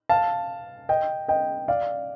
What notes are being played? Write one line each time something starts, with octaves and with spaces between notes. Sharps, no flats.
F5 A5
D#5 G5
D#5 G5
D5 F5